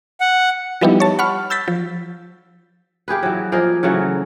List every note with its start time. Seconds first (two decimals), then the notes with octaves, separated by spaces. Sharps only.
0.21 F#5
0.81 F3 G3 B3 D#4 E4 G4
1.00 C#5 A5
1.19 F#5 B5 C#6 F6
1.50 E6 G6 A6 B6
1.68 F3
3.08 A#3 G4 G#4 B4
3.23 E3 F#3
3.52 F3 A#3 G#4 D#5
3.83 C#3 E3 F#3 A3